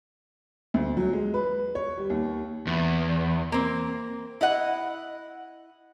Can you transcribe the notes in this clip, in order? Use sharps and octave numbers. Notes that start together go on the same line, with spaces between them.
D2
F#3
G#3
B4
C#5
G3
D#2
E2
A#3 C4
E4 D#5 F#5